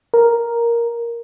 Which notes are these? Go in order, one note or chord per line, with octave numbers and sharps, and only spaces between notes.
A#4